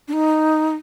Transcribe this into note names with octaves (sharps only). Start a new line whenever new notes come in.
D4
D#4